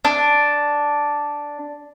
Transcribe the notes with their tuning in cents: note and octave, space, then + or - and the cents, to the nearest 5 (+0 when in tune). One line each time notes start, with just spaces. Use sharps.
D4 -5